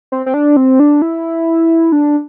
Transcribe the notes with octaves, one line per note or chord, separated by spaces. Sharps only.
C4
C4
D4
C4
D4
E4
D4